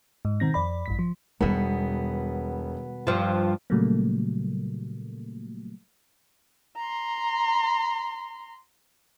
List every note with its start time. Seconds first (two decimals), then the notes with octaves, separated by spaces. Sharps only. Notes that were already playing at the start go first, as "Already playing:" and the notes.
0.25 G#2
0.40 B2 D#3 C4 A#6
0.54 F2 D5 B5
0.86 A1 G2 B6
0.99 F3
1.41 E1 B2 D#3 G3 B3
3.07 G2 F3
3.70 A#2 C#3 F#3 G3 A3 A#3
6.77 A#5 C6